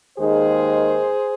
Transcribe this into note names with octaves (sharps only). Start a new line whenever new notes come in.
D#2 D#3 G#3 D#4 G#4 C5